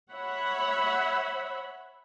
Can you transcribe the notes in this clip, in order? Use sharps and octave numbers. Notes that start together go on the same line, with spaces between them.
C#5 E5 F#5 B5